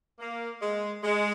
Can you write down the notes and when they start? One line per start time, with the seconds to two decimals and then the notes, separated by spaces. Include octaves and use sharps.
0.19 A#3
0.61 G#3
1.03 G#3